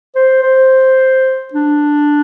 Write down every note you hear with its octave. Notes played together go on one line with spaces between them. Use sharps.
C5
C5
D4